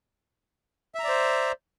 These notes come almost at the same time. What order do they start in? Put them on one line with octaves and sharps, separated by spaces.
E5 A#5 D5 C5